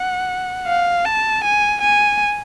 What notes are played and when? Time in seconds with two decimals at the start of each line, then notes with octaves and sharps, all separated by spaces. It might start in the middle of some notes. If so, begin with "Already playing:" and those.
Already playing: F#5
0.67 F5
1.05 A5
1.44 G#5
1.81 G#5